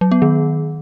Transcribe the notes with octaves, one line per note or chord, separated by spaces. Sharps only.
F#3
B3
D#3